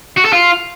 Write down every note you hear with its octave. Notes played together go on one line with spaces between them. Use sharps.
F#4
A4
F4